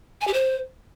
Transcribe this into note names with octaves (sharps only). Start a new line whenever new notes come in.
G#5
G4
C5